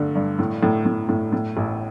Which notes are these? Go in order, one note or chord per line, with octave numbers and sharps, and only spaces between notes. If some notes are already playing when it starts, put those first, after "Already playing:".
Already playing: G2 D3 A3
G2
A2
A2
A2
A2
A2
A1